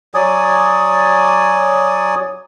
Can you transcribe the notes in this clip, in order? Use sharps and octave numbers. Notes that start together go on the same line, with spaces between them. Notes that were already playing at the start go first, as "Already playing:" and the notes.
F#3 D5 G#5 D#6